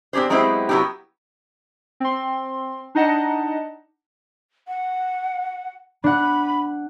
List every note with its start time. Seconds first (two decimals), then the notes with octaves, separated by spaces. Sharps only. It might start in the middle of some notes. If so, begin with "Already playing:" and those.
0.13 C4 D4 G4 G#4 C5
0.30 F#3 G#3 B3 C4 E4 G4
0.69 F#3 B3 D#4 E4 G4
2.00 C4 C6
2.95 D4 D#4 D#5 F#5 A5
4.68 F#5
6.04 D4 F#5 B5